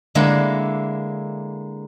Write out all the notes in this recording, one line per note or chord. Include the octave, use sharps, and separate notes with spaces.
D3 G#3 A#3 E4